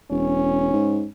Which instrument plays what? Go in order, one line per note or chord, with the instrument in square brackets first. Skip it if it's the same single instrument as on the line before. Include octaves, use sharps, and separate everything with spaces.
[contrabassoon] E1 [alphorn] C#4
[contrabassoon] G#2